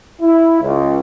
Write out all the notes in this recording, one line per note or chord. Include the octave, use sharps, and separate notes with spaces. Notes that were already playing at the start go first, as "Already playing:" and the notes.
E4
C#2